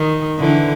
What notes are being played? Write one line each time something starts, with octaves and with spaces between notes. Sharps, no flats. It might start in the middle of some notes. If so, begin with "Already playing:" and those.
Already playing: D#3
D3 E3